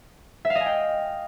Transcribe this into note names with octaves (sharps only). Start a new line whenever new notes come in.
E5
F5
D#5
G#5
G5